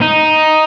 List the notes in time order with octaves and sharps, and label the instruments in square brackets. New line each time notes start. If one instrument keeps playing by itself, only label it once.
[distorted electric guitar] D#4